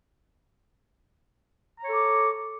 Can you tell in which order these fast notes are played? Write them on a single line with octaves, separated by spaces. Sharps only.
A#5 C#5 A4 D6